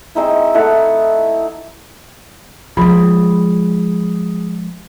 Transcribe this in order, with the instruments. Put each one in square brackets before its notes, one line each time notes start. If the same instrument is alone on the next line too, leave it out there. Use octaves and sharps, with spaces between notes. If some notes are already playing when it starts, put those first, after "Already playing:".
[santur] G#3 C4 D#4 E4
A3 D#4 E4 F#5
[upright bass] F3 G#3 [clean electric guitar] F4 G#4 B5